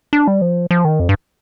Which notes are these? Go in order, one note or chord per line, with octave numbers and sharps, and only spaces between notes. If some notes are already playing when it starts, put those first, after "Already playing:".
D4
G3
F3
F3
D#3
F2
G2